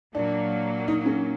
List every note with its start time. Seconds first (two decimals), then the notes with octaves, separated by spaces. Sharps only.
0.14 A#2 F#3 A#3 D4
0.88 D#4
1.06 C#4